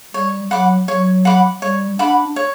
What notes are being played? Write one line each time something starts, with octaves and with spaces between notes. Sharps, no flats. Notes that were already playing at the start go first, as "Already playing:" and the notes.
G3 C#5
F#3 F#5 B5 D6
F#3 C#5
F#5 B5 D6
G3 C#5
D4 F#5 B5 D6
C#5